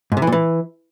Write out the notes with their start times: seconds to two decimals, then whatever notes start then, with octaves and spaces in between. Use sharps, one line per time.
0.12 G#2
0.17 C3
0.22 E3
0.27 A#2
0.32 E3